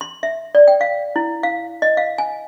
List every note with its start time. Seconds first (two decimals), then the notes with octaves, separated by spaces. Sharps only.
0.01 C6
0.23 E5
0.55 D5
0.68 G5
0.81 F5
1.16 E4
1.43 F5
1.82 D#5
1.97 F5
2.18 G#5